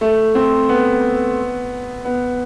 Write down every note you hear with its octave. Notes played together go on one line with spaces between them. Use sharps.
A3
C4
B3
B3